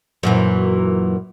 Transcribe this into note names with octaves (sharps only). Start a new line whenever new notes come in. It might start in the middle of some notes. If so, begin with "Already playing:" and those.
F#2 A#2 E3